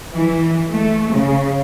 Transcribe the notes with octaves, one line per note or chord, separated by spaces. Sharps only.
E3
A3
C#3